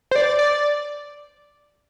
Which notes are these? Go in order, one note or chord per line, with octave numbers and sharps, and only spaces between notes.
C5
D5
D5